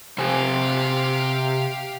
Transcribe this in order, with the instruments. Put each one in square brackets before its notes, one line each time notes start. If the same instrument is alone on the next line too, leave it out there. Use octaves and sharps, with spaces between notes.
[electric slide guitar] C3 C5 G#5 [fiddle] G4 F5